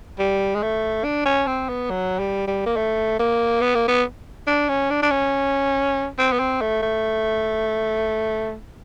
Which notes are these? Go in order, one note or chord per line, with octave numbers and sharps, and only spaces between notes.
G3
G#3
A3
D4
C#4
C4
B3
F#3
G3
G3
A#3
A3
A#3
B3
A#3
B3
D4
C#4
D4
D4
C#4
C4
B3
C4
A3
A3